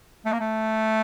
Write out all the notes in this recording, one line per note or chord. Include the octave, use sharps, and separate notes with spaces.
A3
A#3
A3